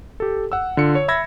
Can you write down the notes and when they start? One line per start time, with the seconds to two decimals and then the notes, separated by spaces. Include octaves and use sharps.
0.20 G4 A4
0.52 F#5 E6
0.77 D3 F4 C#7
0.95 C#5
1.08 E5 B5 E6 G#6 A#6